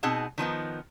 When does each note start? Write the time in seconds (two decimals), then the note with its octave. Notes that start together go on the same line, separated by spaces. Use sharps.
0.03 B2 C4 D#4 G#4 F#5 A5
0.38 D#3 F3 B3 D#4